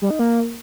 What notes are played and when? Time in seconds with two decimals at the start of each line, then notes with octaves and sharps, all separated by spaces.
0.02 G3
0.10 D#4
0.19 A#3